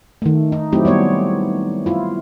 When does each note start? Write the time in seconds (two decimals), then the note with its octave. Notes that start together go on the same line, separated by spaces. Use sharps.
0.22 D#3 A3
0.52 D#4
0.72 F#3 A3 C4 E4 G4
0.85 G3 B3 C#5
1.86 E4 F4